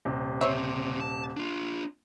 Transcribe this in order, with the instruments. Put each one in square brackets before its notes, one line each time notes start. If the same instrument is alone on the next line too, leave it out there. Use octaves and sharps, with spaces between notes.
[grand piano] D#1 C3
[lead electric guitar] C#3 C4 [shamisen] C5 C#5 E5
[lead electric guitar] A5
D4 F4